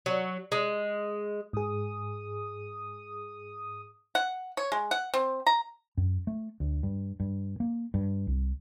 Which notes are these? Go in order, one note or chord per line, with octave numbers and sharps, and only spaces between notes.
F#3
G#3
G#2 G#4 D#6
F#5
C#5
G#3
F#5
C4
A#5
F#2
A3
D2
G2
G2
A#3
G2
C2